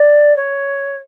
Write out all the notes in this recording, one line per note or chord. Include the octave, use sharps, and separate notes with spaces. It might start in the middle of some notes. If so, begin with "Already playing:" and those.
Already playing: D5
C#5